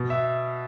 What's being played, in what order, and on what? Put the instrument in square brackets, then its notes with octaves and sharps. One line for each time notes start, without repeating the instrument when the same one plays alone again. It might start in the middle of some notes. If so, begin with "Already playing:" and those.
Already playing: [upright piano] B2
E5